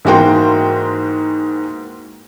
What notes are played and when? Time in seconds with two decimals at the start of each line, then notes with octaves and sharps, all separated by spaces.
0.05 G#2 E3 A#3 F#4 G5 C6